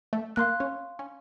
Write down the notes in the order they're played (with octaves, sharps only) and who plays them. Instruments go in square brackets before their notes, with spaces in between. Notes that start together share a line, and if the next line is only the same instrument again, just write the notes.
[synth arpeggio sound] A3
[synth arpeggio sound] A#3 [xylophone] F5 C6 F#6
[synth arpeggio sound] C#4
C#4